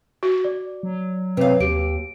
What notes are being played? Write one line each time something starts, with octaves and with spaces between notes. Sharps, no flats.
F#4
D5
F#3
C3 B4 C#5 F5
D#2 G4 D7